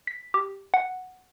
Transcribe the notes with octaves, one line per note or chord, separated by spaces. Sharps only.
B6
G4
F#5